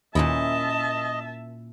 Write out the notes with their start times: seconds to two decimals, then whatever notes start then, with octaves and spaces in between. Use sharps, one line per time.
0.15 D#2 A#2 C#4 E4 D#5 E5 A5